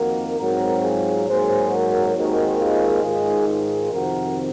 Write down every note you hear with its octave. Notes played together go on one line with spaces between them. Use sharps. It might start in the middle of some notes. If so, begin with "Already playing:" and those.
Already playing: F2 D#3 A#3 F#4 A#4
G#2 F#3 C4 F#4 A#4
F4 G#4
G#2 F#3 A#3 G#4 C5
F#4 A#4
D#2 D#3 G#3 C4 F#4 A#4
F4 G#4
G#2 D#3 G#3 F4 G#4
F4 G#4
F2 C3 D#3 F#4 A#4